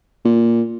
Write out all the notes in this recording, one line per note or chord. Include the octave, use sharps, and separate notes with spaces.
A#2